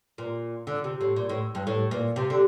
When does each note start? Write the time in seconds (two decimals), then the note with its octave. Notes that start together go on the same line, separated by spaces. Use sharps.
0.18 A#2
0.67 D3
0.84 C3
1.01 A2
1.16 A#2
1.29 A2
1.55 G2
1.67 A2
1.91 A#2
2.16 C3
2.30 D3